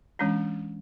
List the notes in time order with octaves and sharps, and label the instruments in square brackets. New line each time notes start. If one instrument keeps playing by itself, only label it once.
[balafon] E3 G#3 C#4 D4